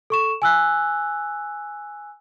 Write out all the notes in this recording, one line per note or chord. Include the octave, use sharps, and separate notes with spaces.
A4 C#6 E7
G#5 E6 F#6